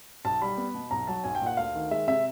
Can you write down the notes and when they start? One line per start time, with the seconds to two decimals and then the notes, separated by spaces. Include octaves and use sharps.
0.25 B1 A5
0.42 G3 B5
0.58 B3
0.75 B2
0.91 B1 A#5
1.07 F#3 A5
1.24 B1 G#5
1.35 G5
1.41 A#2
1.46 F#5
1.57 D2 F5
1.74 D#3
1.91 G#3 E5
2.08 C3 E5